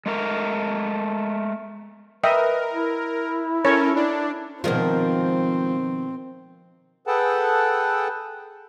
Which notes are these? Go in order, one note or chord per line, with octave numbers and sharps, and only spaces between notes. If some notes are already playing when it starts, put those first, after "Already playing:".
G#3 A3 A#4
A#4 B4 D#5 E5 G5
E4
C#4 A4 A#4 C#5
D4 E4
B2 D#3 F3 G#3 C4 F4 A#4
G#4 A4 B4 F#5 G5 A5